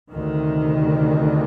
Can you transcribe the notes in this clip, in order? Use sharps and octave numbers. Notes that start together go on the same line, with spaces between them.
D2 C3 D#3